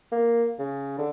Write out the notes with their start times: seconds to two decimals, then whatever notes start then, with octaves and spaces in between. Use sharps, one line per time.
0.12 A#3
0.59 C#3
0.98 D3